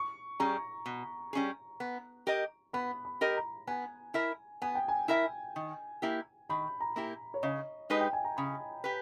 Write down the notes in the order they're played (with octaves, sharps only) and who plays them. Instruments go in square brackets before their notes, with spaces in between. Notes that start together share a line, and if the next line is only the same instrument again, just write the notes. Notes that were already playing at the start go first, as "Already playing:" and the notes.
Already playing: [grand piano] C#6
[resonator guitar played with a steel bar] G3 C#4 G#4 [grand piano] A#5
[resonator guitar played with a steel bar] B2
G3 C#4 G#4
B3
G4 A#4 D#5
[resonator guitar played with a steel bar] B3 [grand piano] B5
[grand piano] B5
[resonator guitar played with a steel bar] G4 A#4 D#5
[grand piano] A#5
[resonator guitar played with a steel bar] B3 [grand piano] G#5
[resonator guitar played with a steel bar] E4 A#4 E5
[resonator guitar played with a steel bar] B3 [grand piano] G#5
[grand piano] G5
G#5
[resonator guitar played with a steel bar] E4 A#4 E5
D#3
A#3 E4 G4
[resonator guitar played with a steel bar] D#3 [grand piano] B5
[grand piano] A#5
[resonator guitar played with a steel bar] A#3 E4 G4
[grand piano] C#5
[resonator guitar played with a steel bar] C#3 [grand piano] D#5
[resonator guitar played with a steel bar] G#3 D#4 G4 B4
[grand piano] G5
G#5
A#5
[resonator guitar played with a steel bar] C#3 [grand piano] B5
[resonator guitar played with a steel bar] G4 B4